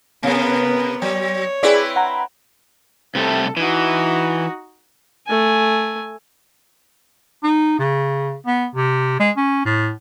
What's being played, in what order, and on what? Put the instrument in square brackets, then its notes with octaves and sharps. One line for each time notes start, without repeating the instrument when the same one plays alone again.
[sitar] C3 [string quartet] B3 A#4 B4
[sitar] F#3 [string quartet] C#5
[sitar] C4 E4 B4 [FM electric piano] G#4 D5
[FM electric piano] F#5 A#5
[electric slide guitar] C3 G3 A3 [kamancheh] A4
[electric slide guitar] E3 [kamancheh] D#4 F#4
[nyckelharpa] A3 G#5
[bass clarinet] D#4
C#3
B3
C3
G#3
C#4
A2